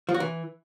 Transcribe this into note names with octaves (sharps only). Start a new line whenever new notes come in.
F3
F#4
E3